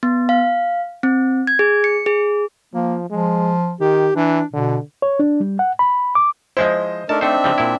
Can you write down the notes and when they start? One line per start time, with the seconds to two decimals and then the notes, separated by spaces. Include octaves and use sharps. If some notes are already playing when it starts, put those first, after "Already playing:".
0.03 B3
0.29 F5
1.03 C4
1.47 G#6
1.59 G#4
1.84 C#7
2.06 G#4
2.74 F3 A#3
3.10 F3 G#3
3.81 D#3 G4
4.16 E3 D4
4.53 B2 D3
5.02 C#5
5.19 D4
5.40 G3
5.59 F#5
5.79 B5
6.15 D6
6.57 F3 G#3 E4 C5 D#5
7.09 A3 D4 D#4 A#4 A5
7.21 A3 C4 D4 C5 E5
7.44 C#3 F3 G3
7.58 A#2 E4